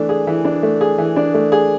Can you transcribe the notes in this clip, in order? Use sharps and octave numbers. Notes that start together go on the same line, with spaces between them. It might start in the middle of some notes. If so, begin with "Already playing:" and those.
Already playing: E3 A3 D4
G#4
E3
D4
A3
G#4
E3
D4
A3
G#4